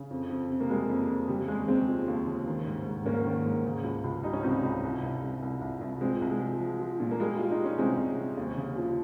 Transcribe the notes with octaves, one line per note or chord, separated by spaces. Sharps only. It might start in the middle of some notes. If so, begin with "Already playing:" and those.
Already playing: C#3
F2
F2
C3
A#3
G3 G#3
F2
F2
C#3 G3
D#2 G#3
D#2 G#3 C4
F3
D#2
C#3
D#3
G#2
G#2
G#2 A#3 C#4
D#3
G#2
C#3
C#2
C#2
G3 D#4
C#4
C#2 C4 D#4
C#2
C2
C2
C2
C2
C2
C2
F3 G#3 C4
C2
G#3
F3
F3
F3
A#2
A#3
G3 G#3
G3 F4
D#4
G3
C#4
C2 G#3 C4
C2
C3
D#2
C#3
F3